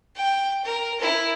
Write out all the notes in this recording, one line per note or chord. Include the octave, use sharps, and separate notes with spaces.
G5
A#4
E4 A#4